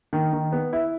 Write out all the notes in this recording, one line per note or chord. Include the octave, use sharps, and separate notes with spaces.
D#3
D#3
B3
E4